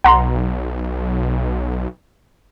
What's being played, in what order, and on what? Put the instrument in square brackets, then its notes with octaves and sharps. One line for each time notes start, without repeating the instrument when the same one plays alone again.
[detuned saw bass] B1 [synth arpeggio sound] F#5 A#5 C6